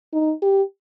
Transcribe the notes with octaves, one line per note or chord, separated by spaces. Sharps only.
D#4
G4